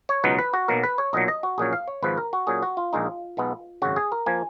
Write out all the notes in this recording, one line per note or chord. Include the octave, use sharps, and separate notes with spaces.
C#5
C#2 B2 F#3 B3 D#4 B4
B4
F#4
B1 B2 F#3 A#3 A#4
B4
C#5
B1 A#2 F#3 D#5
D#5
F#4
A#1 A#2 F#3 C#4 G#4
F5
C#5
G#1 G#2 F3 B4
A#4
F#4
A#2 F#3 C#4 G#4
F#4
F4
A#1 A#2 G#3 D#4
B1 B2 G#3 B3
G#1 F#2 C#3 F#4
G#4
A#4
F3 A#3 G#5